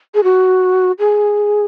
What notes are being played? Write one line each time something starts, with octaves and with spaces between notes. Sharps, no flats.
G#4
F#4
G#4